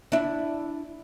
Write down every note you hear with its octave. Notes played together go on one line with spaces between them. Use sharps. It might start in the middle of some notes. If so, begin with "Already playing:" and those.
D4 E4